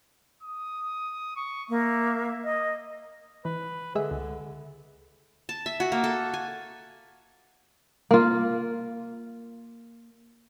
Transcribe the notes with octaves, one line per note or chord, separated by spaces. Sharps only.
D#6
C#6
A#3 E5
D#5
E3 B4
D3 G#3 G#4 E5
C#2
A5
E5
F#4
A#3
A4
G#5
A#3 F4